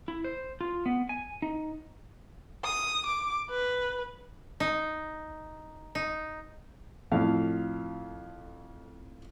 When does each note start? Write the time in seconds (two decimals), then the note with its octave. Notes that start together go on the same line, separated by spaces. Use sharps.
0.08 E4
0.25 C5
0.61 F4
0.86 B3
1.09 G#5
1.42 D#4
2.64 D#6
3.06 D6
3.50 B4
4.60 D#4
5.95 D#4
7.12 F2 A2 F5